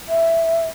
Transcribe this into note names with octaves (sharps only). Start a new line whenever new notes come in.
E5